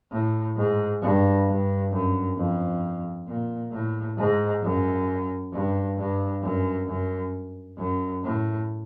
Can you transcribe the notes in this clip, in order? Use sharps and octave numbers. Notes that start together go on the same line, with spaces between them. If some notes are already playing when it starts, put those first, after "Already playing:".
A2
G#2
G2
G2
F#2
F2
A#2
A2
G#2
F#2
G2
G2
F#2
F#2
F#2
A2